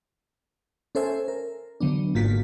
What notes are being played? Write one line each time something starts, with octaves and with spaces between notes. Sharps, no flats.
C#4 A4 C5 E5 G#5
A#4
D3 F#3 B3 D4
G#1 G#2 A#3 F4 F#4 B6